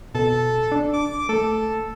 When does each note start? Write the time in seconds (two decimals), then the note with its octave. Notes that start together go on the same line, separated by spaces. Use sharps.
0.15 B2 A4
0.72 D4
0.94 D6
1.29 A3 A4